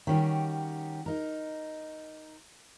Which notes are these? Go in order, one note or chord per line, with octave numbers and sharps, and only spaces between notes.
D#3 G3 C#4 F#4 G4
D#4 A#4